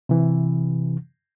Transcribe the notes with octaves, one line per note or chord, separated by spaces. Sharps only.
C3 E3